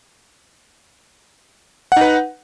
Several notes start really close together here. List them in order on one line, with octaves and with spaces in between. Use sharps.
F#5 D#4 B4